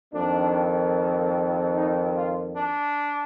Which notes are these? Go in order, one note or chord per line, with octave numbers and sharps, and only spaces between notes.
F2 D#3 A#3 D4
D#4
F4
D4